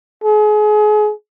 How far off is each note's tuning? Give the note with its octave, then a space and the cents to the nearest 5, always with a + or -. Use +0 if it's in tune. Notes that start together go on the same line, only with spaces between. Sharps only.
G#4 +35